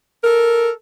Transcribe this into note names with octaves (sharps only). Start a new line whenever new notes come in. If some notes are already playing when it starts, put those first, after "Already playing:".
A4 A#4